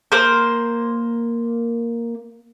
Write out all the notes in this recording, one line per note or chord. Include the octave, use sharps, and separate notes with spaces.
A#3 C5